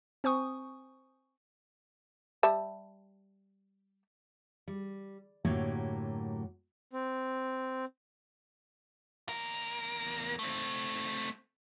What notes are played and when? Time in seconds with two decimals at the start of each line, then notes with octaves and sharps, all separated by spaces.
0.24 C4 C5 G#5 C#6 D#6
2.43 G3 E5 A5
4.68 G3
5.45 F#2 A2 D3 F#3 A#3 G4
6.93 C4
9.29 E2 A#4
10.39 A3 C4